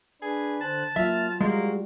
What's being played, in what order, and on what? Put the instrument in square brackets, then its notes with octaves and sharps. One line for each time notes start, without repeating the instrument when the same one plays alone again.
[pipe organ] D4 B4 [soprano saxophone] G#4
[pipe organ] D3 C5 F#6 [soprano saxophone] A5
[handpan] F#3 F4 [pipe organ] A#3 F6 [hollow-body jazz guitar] E5
[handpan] G3 [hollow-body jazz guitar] G#3 [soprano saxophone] A#3 [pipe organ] F#4